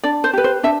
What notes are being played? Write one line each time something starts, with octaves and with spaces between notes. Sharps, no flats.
D4 D5
C5
G4 B4
C5
D4 E5